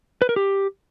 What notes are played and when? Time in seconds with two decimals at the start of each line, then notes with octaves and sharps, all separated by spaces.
0.22 B4
0.29 A#4
0.36 G4